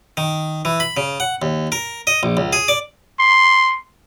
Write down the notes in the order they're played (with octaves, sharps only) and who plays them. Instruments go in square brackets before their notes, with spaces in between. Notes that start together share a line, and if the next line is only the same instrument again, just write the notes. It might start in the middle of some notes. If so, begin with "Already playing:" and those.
[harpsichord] D#3
E3
B5
C#3
F#5
D#2
A#4
D#5
A#1
C#2
G#4
D5
[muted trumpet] C6